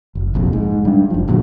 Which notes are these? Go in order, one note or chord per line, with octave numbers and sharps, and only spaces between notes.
F#1
F1 A#1 F2
G#2
G3 D4
F#1 F3
D1 D2 A#2 F#3